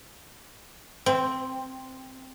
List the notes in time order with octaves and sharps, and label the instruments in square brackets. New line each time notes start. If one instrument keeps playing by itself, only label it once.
[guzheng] C4